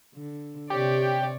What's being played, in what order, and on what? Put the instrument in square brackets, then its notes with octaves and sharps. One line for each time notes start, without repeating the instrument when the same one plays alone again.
[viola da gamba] D3
[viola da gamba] C3 C#5 D5 [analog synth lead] G4